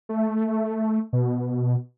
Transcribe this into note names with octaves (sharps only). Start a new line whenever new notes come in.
A3
B2